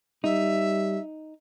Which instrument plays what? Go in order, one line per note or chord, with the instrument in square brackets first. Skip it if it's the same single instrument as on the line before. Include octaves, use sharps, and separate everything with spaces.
[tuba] G3 [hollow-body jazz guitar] D#4 [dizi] E5